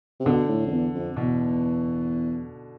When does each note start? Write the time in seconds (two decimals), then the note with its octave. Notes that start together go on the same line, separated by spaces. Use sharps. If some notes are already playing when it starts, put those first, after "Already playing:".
0.20 C3
0.26 B2 D3
0.48 A2
0.66 F2
0.71 E2
0.94 F2
1.16 E2 B2